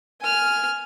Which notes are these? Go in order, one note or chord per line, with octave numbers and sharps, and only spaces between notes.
G#5 F6